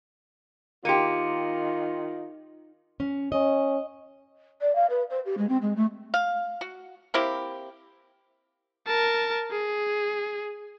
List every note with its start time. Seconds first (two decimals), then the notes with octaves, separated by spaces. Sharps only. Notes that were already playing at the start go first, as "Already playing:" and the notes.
0.85 D#3 A#3 F4 G4 C6 C#7 D#7
3.00 C#4
3.32 C#4 D#5
4.61 D5
4.75 F5
4.90 B4
5.10 C5
5.25 G4
5.37 G#3
5.49 C4
5.62 G#3
5.76 A3
6.14 F5
6.61 F#4
7.14 A#3 C4 E4 G4
8.87 A#4 A5
9.51 G#4